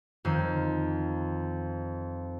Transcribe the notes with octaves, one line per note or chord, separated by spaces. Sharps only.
F2 D#3